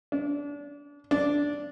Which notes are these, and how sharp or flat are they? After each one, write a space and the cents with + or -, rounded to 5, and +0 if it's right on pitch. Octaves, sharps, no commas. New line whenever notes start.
D4 -30
D4 -10